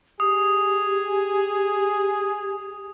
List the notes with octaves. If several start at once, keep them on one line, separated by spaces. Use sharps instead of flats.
G4 G#4 D#6